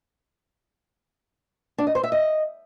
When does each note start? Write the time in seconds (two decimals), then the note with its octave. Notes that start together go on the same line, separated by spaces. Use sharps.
1.78 D4
1.87 D#5
1.95 C5
2.03 E5
2.12 D#5